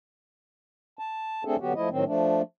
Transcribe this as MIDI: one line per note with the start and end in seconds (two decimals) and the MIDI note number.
0.99 1.44 81
1.45 1.56 57
1.45 1.56 60
1.45 1.56 62
1.45 1.56 68
1.45 1.56 69
1.60 1.73 50
1.60 1.73 54
1.60 1.73 59
1.60 1.73 66
1.60 1.73 67
1.75 1.89 53
1.75 1.89 57
1.75 1.89 64
1.75 1.89 75
1.91 2.04 45
1.91 2.04 51
1.91 2.04 54
1.91 2.04 60
2.06 2.42 53
2.06 2.42 57
2.06 2.42 62